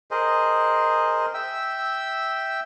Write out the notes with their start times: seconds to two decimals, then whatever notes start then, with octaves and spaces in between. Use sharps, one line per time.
0.11 G#4 A#4 C5 D#5
1.34 E5 G5 E6